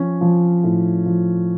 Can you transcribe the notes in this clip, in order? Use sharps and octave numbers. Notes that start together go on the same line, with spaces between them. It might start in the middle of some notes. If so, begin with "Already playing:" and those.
Already playing: F3 C#4
F3
A2
F3